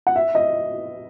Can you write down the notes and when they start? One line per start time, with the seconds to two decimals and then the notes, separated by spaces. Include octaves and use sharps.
0.07 F#5
0.16 E5
0.35 D#5